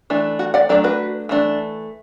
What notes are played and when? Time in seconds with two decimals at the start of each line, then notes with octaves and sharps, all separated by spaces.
0.10 E3 A3 D4
0.39 F#4
0.54 D5 F#5
0.69 F#3 A3 D4 A4 D5
0.84 F#4 B4
1.29 E3 A3 D4